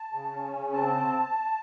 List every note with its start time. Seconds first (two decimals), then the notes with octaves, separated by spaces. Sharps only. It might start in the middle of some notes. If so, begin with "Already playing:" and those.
Already playing: A5
0.12 C#3
0.32 C#4
0.52 C#3
0.73 C4 A5